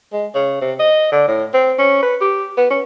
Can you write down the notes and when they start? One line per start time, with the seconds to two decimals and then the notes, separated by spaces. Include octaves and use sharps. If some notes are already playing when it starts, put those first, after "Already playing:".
0.13 G#3
0.34 C#3
0.61 C3
0.79 D#5
1.12 D3
1.28 A2
1.54 C4
1.79 C#4
2.03 B4
2.21 G4
2.57 B3
2.70 C#4